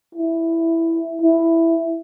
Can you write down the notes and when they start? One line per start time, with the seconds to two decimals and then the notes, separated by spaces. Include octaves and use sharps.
0.15 E4
1.22 E4